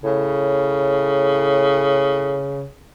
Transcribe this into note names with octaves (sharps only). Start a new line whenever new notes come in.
A2 C#3